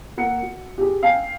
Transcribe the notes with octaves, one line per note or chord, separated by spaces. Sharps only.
A#3 F#5 C#7
F#4
G4 G#4
F5 G5 G#5 C7